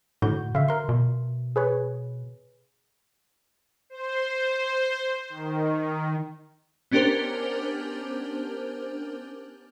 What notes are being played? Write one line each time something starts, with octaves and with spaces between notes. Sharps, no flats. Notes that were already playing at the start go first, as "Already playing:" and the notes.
A2 D3 F#4 G6
D3 E5 F5
A#4 C6
B2
G#4 B4 C#5
C5
D#3
B3 C#4 D4 G4 A#4 C5